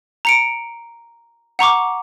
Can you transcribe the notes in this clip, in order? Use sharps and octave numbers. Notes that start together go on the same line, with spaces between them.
A#5 C#7 D7
F#5 A#5 C#6 D6